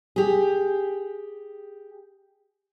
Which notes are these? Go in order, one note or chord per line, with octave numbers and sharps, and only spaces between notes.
G4 G#4